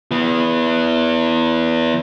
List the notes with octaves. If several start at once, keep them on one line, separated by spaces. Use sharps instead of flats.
E3 B3